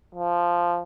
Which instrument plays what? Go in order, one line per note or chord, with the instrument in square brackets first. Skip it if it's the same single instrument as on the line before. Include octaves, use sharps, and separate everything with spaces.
[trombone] F3